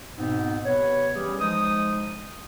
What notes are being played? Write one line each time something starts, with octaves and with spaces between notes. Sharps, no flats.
G#2 B2 B3 C4 D#4
C3 B3 B4 C#5
E3 G3 C#4 G4 G#4
F3 G#3 D#4 D#6